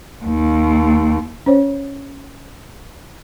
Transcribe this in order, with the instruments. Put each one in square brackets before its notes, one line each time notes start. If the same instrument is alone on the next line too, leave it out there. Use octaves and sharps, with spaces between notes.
[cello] D#2
[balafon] C#4 C5 C#5